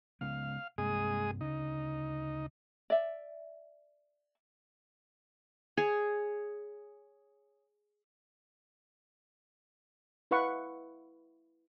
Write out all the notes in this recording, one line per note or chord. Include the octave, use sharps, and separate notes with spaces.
C#3 G#3 B3 F5
G2 C3 G#3 A#3 G#4 D#6
D2 C#3 D#4
D5 E5
G#4 C#5
E4 B4 F5 F#5 C#6